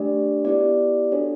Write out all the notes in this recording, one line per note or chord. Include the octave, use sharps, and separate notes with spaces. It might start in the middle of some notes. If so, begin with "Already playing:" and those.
Already playing: A3 D4 G4 D5
B3 E4 G4 D5
D4 F#4 A4 C#5